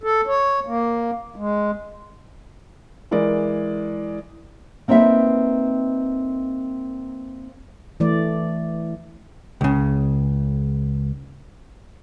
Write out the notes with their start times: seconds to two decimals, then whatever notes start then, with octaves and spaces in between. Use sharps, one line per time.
0.03 A4
0.27 C#5
0.67 A#3
1.36 G#3
3.11 E3 G#3 A#4 D5
4.88 A#3 C4 D#4 B4 E5
8.00 E3 A3 D5
9.61 C#2 C#3